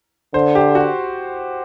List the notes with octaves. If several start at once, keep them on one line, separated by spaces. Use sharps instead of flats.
D3 C5
G4
F#4